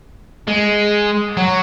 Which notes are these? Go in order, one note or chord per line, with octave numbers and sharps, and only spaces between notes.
G#3
F#3